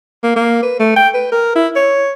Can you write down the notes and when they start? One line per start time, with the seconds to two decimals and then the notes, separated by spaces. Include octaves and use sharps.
0.24 A#3
0.36 A#3
0.63 B4
0.80 A3
0.96 G5
1.15 B4
1.32 A#4
1.56 E4
1.76 C#5